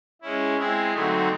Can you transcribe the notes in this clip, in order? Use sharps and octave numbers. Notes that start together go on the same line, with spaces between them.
G#3 C#4 E4
G#3 C4 E4 G#4
D3 F#3 A3 C4 D#4